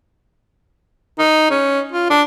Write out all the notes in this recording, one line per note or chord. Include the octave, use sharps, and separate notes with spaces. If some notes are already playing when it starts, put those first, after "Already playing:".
D#4
C#4
F4
D4